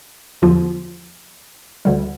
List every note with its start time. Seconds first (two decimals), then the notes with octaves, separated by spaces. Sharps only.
0.42 E2 D3 F3 F4
1.85 D2 D3 G3